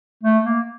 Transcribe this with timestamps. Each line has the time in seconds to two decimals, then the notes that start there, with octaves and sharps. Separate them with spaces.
0.23 A3
0.45 A#3